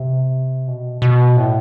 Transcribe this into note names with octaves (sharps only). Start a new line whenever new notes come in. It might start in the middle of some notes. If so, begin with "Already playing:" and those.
Already playing: C3
B2
B2
A2